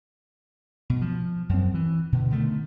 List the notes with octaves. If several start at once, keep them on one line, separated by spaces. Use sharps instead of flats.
B2
F3
F#2 C4
E3
B2 D3
B2 D3 D#3 A3